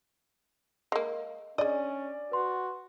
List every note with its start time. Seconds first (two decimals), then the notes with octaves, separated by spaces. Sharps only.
0.92 G#3 A#3 D#5
1.58 C#4 D4 G#4 D5 D#5
2.32 F#4 B4 C6